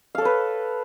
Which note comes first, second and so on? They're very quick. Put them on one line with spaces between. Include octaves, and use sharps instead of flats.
F5 A4 C#5 B4